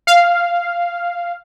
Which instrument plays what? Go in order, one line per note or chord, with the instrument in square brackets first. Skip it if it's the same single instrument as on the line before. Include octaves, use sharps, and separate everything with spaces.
[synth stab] F5